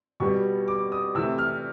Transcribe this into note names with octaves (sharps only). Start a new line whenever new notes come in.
B2 G3 B3 C#6
D6
D#6
C3 E3 A3 E6
F6